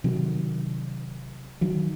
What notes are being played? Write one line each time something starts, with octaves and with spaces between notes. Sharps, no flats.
C3 D#3 F#3
D#3 F#3